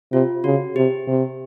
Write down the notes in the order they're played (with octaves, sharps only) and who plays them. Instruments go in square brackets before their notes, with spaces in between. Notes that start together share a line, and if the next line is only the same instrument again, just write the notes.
[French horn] C3 [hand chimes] F4
[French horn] C#3 [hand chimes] F#4
[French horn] C3 [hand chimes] G4
[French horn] C3